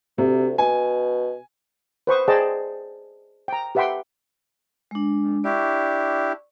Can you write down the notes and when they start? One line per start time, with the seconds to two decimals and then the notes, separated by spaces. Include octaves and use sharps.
0.18 D2 C3
0.58 B2 G#5
2.07 B4 C5 C#6 D#6
2.28 G#4 C5 D5 D#5 G5 A5
3.48 G5 A#5
3.75 G4 B4 E5 F#5 G5 C6
4.91 G#3 D4
5.22 F2
5.44 D4 E4 G4 D5 C#6